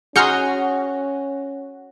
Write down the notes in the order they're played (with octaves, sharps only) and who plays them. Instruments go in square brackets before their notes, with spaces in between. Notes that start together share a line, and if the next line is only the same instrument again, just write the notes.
[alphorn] C#4 [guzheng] F#4 [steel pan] G#4 A#5 C6 [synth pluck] F6 G6 C#7